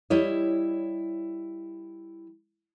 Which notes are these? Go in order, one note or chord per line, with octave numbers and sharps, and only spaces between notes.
G3 E4 C#5 D#5